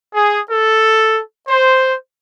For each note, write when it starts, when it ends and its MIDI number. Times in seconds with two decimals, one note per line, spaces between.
0.15 0.40 68
0.50 1.21 69
1.48 1.95 72